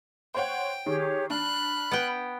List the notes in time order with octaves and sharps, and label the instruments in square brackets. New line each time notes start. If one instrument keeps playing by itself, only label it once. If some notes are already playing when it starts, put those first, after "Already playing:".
[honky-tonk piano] C5 C#5 F#5 [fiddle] G5
[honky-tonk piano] D#3 [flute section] G4 G#4 C#5
[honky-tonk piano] D4 [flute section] B5 F6 [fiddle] F#6
[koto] B3 G5